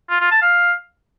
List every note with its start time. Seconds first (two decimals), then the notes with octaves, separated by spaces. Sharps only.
0.10 F4
0.20 F4
0.31 A5
0.42 F5